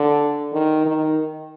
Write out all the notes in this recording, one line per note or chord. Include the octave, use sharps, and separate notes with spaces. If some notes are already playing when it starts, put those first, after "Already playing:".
Already playing: D3
D#3
D#3